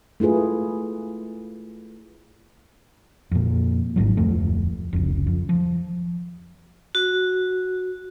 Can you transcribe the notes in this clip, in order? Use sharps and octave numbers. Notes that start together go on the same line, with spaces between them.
A3 E4 F4 G#4 B4
F2 A#2
G#1 E2 G#2 F#3
D1 F2 A3
F1 C#2
F2
F3
F#4